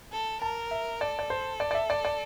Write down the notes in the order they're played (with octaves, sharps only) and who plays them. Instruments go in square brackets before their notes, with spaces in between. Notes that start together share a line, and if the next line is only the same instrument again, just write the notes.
[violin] A4
[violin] A#4 [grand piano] A5
[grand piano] E5
[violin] A4 [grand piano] D5
[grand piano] D5
C5
D5
D5
E5
D5
D5